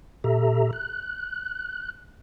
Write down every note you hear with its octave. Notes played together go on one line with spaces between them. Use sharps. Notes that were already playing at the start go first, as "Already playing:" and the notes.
A#2 G4 A4 E5 A#5
F#6